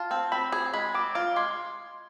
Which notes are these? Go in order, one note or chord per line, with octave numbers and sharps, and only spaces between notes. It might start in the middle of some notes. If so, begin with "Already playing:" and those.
Already playing: F4 A5
C4
C4 B5
G#4
G#3 B5
C4 D6
F4 D6
G#3 C6